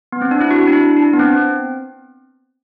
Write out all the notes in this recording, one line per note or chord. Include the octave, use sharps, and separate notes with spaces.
B3
C4
D4
E4
F#4
D4
E4
D4
B3
C4